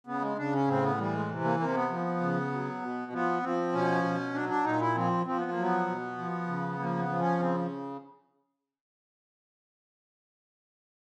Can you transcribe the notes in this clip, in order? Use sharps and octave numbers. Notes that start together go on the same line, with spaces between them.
C#3 B3
G#3
C#3 D4
C#4
A2 C4
B3
E3 G3
G#3
C3
A#3
C3 A#3
B3
F3
C#3
F#3
B2
F3 B3
F3 C4
B2 C#4
B2
F#3 D4
D4
A#2 D#4
E4
F3 C4
F3 C4
B3
A#3
F#3
B3
B2
F3
C#3
F3 A#3
B3
F3
C#4
C#3 C4